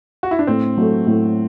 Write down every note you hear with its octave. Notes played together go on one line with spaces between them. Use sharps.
F#4
E4
D4
A2 C4
F#3 A3
A2